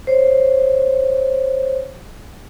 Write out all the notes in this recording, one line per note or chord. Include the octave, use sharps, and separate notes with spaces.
C5 C#5